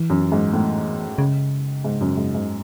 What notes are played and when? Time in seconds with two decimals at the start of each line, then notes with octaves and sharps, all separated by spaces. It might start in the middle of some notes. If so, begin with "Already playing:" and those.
Already playing: E3
0.10 F#2
0.32 G#2
0.53 A2
1.18 C#3
1.84 G#2
2.01 F#2
2.17 G#2
2.34 G#2